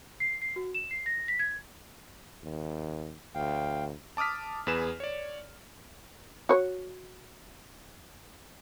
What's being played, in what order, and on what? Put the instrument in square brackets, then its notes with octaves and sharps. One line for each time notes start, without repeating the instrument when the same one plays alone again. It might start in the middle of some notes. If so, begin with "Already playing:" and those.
[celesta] C7
C7
F#4
E7
C7
A#6
B6
G#6
[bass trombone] D#2
[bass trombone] D2 [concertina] F5 G5
[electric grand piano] A5 D6 D#6 F6 B6
E2 G#4 B4 E7
C#5 D5
[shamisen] F#4 C#5